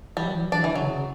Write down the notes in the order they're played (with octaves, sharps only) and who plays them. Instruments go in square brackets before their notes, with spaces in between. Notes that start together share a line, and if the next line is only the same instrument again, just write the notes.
[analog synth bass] E3 [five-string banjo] G3
[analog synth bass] F#3
E3
F#3
[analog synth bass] E3 [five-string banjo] D4
[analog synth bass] D3 [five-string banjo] E3
[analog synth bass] C#3 [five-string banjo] F#3
[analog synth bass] C#3